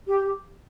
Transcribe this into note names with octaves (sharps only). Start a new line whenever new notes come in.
G4